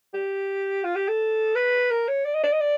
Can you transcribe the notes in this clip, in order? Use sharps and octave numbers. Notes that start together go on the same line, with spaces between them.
G4
F4
G4
A4
B4
A#4
C#5
D5
D#5
D5
D#5
D5